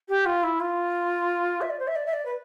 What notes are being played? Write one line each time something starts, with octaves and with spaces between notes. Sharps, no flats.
G4
F4
E4
F4
E5
D5
C5
E5
D5
E5
D5
B4